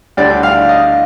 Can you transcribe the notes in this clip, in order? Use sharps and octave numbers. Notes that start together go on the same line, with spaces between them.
D2 D3 G3 D5
F5
D#5